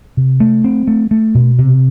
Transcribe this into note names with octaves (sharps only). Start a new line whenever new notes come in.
C3
A3
C4
A3
A3
B2
C3